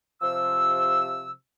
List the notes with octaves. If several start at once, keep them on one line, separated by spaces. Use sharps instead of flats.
C3 F3 E6